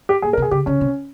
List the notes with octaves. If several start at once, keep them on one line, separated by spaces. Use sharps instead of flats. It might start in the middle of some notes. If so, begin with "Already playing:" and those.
G4
A#2 G#4
A#4
C3 G#4
C#3 G4
C#3 C#4
C3